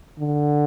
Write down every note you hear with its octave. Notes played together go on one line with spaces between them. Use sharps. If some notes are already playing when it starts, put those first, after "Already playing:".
D3